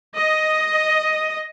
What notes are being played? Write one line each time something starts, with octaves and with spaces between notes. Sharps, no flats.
D#5